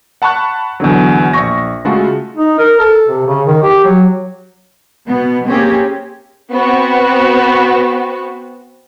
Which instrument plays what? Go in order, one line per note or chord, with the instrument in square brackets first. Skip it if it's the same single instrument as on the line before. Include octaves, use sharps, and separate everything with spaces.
[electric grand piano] F#5 A5 B5 C#6 F#6
E2 B2 D3 F#3
A#1 C#6 A#6
C#3 G#3 A3 F4 F#4 A4
[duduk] D#4
A#4
A4
C3
C#3
D#3
G4
F#3
[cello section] B2 B3
A#3 C4 C#4 G4 G#4
[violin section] B3 C4 F#4